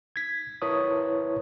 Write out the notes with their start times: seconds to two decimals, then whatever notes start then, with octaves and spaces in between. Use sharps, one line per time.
0.16 G#6 B6
0.62 E4 A#4 B4 C#5 A5 D#6